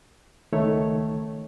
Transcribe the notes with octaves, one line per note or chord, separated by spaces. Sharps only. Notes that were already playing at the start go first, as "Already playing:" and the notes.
C#2 D#3 A3 C#5